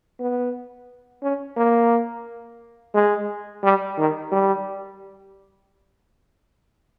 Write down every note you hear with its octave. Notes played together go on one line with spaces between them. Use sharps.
B3
C#4
A#3
G#3
G3
D#3
G3